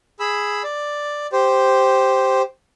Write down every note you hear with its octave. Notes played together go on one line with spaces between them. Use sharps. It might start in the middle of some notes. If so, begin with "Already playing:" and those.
G#4 B5 E6
D5
G4 C5